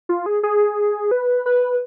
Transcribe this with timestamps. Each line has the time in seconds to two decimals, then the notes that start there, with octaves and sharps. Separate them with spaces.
0.09 F4
0.26 G#4
0.43 G#4
1.11 B4
1.46 B4